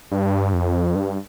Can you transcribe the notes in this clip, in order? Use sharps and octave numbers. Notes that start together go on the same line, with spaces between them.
G2
F2
G2